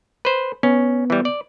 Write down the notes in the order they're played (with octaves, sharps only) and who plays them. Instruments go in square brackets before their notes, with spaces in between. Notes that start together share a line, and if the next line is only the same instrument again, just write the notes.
[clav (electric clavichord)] B4 C5
[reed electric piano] B3 [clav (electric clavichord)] C#4
[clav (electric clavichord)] E3 G3
D5